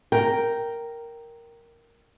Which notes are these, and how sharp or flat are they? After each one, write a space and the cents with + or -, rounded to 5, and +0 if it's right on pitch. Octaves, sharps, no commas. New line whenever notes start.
A#4 +0 G5 -10